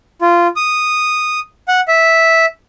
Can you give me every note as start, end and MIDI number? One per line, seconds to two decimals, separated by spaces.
0.22 0.47 65
0.56 1.40 87
1.68 1.80 78
1.88 2.46 76